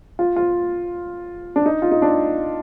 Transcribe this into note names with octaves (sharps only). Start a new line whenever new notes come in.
F4
F4
D4
D#4
F4
D#4
D4